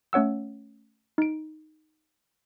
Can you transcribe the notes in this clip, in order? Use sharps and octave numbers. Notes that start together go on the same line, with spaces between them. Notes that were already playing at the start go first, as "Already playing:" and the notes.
A3 C#4 C#5 F#5 E6
D#4 D7